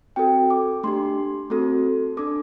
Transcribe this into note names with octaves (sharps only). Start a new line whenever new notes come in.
C4 F#4 A4 G5
D6
A3 D4 G4 C6
A3 C4 F#4 A4
D4 A4 D6